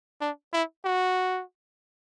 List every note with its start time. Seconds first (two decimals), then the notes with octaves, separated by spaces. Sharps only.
0.21 D4
0.53 E4
0.85 F#4